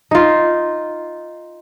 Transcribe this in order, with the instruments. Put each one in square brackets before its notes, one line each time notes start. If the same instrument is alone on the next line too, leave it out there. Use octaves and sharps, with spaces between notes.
[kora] D#4 F4